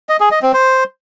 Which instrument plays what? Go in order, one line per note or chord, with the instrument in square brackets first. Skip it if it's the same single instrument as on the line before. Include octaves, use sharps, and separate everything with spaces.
[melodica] D#5
G#4
D#5
C4
C5